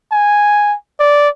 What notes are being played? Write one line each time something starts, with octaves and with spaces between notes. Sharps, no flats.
G#5
D5